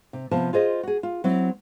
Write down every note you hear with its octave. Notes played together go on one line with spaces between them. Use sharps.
C3
C3 F3 B3 C5 A5
F4 G#4 C5 D#5
F#4 G#4
F4
F#3 C4 E4